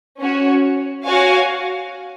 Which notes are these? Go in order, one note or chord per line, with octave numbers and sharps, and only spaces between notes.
C#4 F#4 C#5
F#4 C#5 F5 G#5